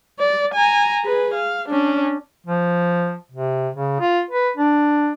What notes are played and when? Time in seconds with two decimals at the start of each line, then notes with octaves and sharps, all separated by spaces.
0.19 D5
0.54 G#5 A#5
1.04 G#4 B4
1.34 F5
1.69 C#4 D4
2.46 F3
3.31 C3
3.74 C#3
4.00 F4
4.30 B4
4.57 D4